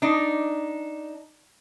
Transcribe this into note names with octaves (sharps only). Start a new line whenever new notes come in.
D4 D#4